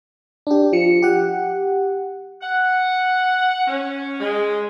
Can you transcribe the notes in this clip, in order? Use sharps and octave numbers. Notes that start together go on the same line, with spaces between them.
D4 G4
F3 C#7
G4 F#5
F#5
C#4
G#3